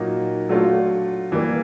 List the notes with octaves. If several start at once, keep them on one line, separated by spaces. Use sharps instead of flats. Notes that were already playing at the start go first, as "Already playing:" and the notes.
Already playing: A#2 F#3 A#3 D#4
F#3 A3 D4 F4
E3 G3 A#3